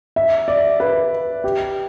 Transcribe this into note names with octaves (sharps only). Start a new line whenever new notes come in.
E5
D5
B4
G4